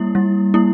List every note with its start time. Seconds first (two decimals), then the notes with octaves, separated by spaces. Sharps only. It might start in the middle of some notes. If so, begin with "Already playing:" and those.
Already playing: G3 A#3 E4
0.15 G3
0.54 A#3 E4